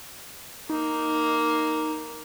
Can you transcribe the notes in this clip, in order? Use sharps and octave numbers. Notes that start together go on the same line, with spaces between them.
A#3 D#4